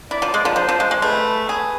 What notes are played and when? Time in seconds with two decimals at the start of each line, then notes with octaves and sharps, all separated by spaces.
0.11 E4 D5
0.22 F3
0.34 G#3
0.45 F3
0.56 F3 C5
0.69 F3
0.80 G#3
0.91 G#3
1.02 A3 B4
1.49 G#4 B4